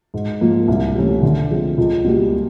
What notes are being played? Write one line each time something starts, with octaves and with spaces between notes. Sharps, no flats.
G#2
F3 A#3
C2
C3 E3 A3 C#4
D3
F3 G#3 C4
C#2
B2 G3 A#3